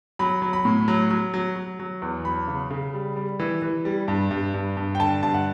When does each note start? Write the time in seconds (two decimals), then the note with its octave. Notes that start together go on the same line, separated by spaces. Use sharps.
0.19 F#3 B5
0.42 F#3
0.53 B5
0.65 A2
0.88 F#3
1.11 F#3
1.34 F#3
1.56 F#3
1.79 F#3
2.02 E2
2.25 F#3 B5
2.47 C#3
2.71 C#3
2.94 G3
3.16 G3
3.40 E3
3.62 E3
3.85 G3
4.08 G2
4.31 G2
4.54 G2
4.77 G2
4.95 G5
5.00 D3 A5
5.23 G2 A5
5.34 F#5